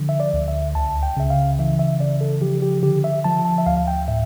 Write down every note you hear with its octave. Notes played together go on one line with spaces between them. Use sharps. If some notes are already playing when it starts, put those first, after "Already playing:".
Already playing: D3 F3
E5
D5
D2
E5
C#2 A5
G5
C#3 E5
F5
E3 E5
E5
C#3 D5
A4
F3 G4
G4
D3 G4
E5
F3 A5
A5
E5
D2 F5
F5
G5
A2 E5